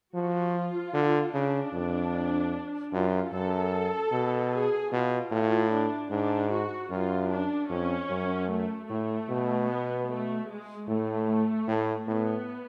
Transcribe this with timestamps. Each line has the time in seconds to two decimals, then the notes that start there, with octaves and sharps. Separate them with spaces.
0.15 F3 F#4
0.55 F4
0.94 D3
1.34 C#3 D4
1.73 F2
2.93 F#2 F4
3.33 F#2 A4
4.12 B2
4.52 G#4
4.92 B2 F4
5.32 A2 F4
5.71 D4
6.11 G#2 D4
6.51 F#4
6.90 F#2 F4
7.30 D4
7.70 F2 C#4
8.10 F#2
8.50 A3
8.89 A2 A3
9.30 B2
9.69 B3
10.09 A3
10.49 G#3
10.88 A2 A3
11.68 A2
12.07 A2 B3